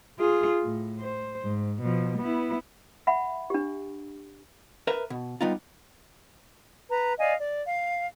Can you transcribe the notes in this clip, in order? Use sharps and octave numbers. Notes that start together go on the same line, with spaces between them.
F4 G#4
A2
C5
G#2
B2 F3
B3 E4
E5 F#5 B5
D4 G4
A#4 B4 E5
B2
G3 B3 D#4 F4
B4 A#5
D5 D#5 F5 G#5
D5
F5